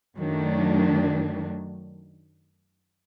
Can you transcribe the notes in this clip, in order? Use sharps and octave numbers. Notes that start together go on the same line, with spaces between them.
F#2 D#3 F#3 A3 D4